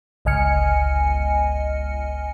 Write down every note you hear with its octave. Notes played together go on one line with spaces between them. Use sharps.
G1 C#2 D#5 G#5 F6 C#7